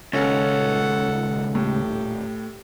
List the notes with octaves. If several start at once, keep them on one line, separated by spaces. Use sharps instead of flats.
D#1 C#2 C#4 A4 F#5
A2 G4